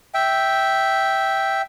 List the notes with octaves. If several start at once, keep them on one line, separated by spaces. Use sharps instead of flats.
E5 G5